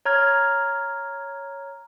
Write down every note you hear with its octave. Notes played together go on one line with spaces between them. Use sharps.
C#5 A#5 F6 G#6